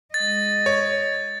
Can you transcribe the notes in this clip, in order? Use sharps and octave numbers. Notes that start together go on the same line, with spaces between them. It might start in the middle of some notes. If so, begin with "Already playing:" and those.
G#3 D#5 A6
C#5